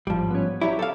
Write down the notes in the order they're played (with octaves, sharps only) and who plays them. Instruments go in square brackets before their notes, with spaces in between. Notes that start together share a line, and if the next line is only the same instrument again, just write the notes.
[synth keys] A1 G#2 [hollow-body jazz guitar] F3 G3
[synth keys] B3 C#4
[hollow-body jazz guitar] F#3 E4 [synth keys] G4 C#5 D5
[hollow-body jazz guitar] A4 F5